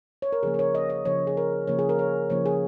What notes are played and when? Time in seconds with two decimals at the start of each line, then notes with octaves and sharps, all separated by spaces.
0.22 C#5
0.33 A#4
0.43 C#3 F3 A#3 G#4
0.54 A#4
0.59 C#5
0.75 D#5
0.90 D#5
1.05 C#3 F3 A#3 C#5
1.27 G#4
1.37 A#4
1.67 C#3 F3 A#3 C#5
1.79 G#4
1.89 A#4
1.99 C#5
2.30 C#3 F3 A#3 C#5
2.46 G#4